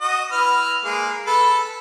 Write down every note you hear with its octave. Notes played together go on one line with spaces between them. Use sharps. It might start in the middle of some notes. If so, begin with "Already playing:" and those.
F#4 D#5
E4 B4 F6
G#3 A#3
A4 B4 B5